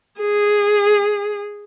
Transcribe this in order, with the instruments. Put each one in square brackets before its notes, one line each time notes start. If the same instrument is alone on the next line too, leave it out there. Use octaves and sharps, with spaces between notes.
[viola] G#4